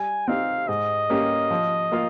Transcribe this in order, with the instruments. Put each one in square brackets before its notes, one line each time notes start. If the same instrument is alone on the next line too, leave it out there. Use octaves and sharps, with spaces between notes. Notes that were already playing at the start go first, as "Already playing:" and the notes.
Already playing: [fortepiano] G3 [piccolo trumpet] G#5
[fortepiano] C4 D#4 G4 [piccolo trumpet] F5
[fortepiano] G#2 [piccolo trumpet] D#5
[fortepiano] G3 A#3 C#4 G4
F3
A#3 F4 A#4 F5